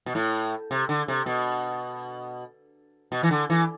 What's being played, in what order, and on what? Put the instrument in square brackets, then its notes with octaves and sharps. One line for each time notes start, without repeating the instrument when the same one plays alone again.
[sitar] B2
A2
C3
D3
C3
B2
B2
E3
D3
E3